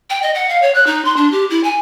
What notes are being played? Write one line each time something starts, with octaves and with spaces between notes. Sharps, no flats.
G5
D#5
F#5
F5
C#5
F#6
D#4
C6
D4
G4
E4
G#5